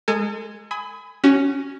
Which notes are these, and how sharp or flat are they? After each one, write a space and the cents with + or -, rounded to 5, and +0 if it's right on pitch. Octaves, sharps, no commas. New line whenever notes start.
G#3 +0 A4 +40 G#5 +0
G#5 +0 B5 +30 D#6 +35
C#4 +0 F#4 +30